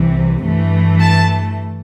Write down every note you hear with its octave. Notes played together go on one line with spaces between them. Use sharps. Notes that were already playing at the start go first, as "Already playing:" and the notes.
Already playing: C2 C3 E3
G2 E3 A3
A5